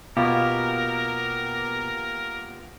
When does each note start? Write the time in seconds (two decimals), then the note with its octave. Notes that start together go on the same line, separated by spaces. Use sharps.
0.17 B2 A#3 B3 F4 G4 A#4